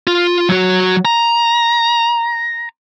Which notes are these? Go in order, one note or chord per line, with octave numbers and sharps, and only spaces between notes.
F4
F#3 F#4
A#5